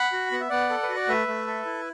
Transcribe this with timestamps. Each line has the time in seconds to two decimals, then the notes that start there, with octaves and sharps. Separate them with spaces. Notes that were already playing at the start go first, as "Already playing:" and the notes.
Already playing: F#5 B5
0.13 F#4
0.32 B3 F#5
0.41 E5
0.49 B3 D5 F#5
0.70 A4
0.83 B4
0.89 F#4
0.96 D5
1.08 A3 B4 E5
1.28 A3
1.47 A4
1.65 E4